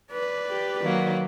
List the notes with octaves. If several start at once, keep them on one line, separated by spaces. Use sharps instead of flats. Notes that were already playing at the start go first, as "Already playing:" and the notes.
B4 D5
G4
D#3 F#3 A#3